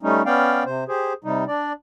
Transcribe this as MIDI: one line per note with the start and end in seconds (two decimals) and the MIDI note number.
0.03 0.22 55
0.03 0.22 57
0.03 0.22 61
0.03 0.22 63
0.26 0.64 59
0.26 0.64 61
0.26 0.64 74
0.26 0.64 77
0.26 0.64 79
0.65 0.84 48
0.65 0.84 72
0.88 1.13 67
0.88 1.13 68
0.88 1.13 72
1.24 1.44 48
1.24 1.44 55
1.24 1.44 63
1.48 1.73 62
1.48 1.73 74